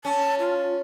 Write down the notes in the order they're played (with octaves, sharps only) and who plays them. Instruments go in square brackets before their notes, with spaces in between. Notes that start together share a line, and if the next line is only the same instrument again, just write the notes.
[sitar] C#4 [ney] A5
[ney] F4